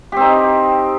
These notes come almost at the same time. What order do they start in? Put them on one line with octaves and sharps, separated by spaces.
G4 C4 D#4